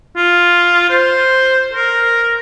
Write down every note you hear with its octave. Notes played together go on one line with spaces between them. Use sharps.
F4
C5
A#4